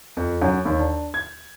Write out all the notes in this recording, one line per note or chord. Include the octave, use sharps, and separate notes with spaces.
F2
F#2
D#2
D4
G#6